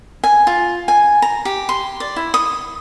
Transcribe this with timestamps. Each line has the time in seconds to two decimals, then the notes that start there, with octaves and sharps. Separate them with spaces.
0.24 G#5
0.47 F4
0.88 G#5
1.22 A#5
1.45 G4
1.69 C6
2.00 D5
2.16 E4
2.34 D#6